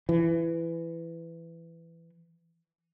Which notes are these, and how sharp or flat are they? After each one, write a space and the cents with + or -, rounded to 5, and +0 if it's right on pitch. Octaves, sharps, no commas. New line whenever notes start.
E3 +15